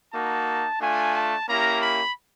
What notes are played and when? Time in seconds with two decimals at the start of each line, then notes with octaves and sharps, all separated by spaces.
0.13 A#3 D#4 F#4 A5
0.80 A3 D4 F4 G#5
1.14 A5
1.48 A#3 C#4 E4 G4 A#5
1.82 B5